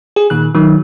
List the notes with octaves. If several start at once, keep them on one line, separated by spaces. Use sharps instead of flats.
G#4
A#2 D#3 F#6
D#3 F#3